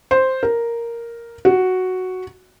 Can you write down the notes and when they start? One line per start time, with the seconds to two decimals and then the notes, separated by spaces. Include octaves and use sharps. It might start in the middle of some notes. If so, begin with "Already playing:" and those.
0.11 C5
0.43 A#4
1.45 F#4